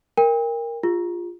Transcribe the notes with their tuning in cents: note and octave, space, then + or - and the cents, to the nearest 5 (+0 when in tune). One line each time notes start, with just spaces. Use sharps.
A#4 +0 G5 +40
F4 +0 G#4 -45